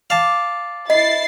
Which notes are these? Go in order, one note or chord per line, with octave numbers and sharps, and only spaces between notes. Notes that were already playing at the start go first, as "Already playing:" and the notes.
D5 F5 A5
E4 D#5 B5 A6 C7